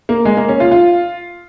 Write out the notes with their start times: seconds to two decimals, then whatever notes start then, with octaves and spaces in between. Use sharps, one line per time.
0.09 A#3
0.25 G#3
0.37 A#3
0.48 C#4
0.60 F4
0.71 F4